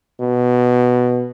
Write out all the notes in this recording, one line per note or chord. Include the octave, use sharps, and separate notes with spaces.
B2